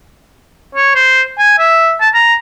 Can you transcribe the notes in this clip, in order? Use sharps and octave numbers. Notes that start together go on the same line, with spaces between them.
C#5
C5
G#5
E5
A5
A#5